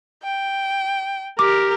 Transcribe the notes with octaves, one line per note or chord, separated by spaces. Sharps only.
G5
G4 A#4 D6